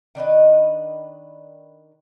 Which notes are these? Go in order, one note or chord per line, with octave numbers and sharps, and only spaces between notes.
D#3 D4 B4 D#5